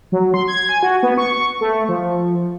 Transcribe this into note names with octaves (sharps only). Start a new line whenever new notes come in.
F#3
C6
G#6
G#5
F#4
B3
C#6
A3
F3